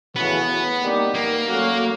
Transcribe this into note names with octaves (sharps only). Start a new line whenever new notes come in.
C#3 E3 A3 B3 C#4 F#4
G3 A#3 D#4 G4
A#3
F#3 A3 C#4 F#4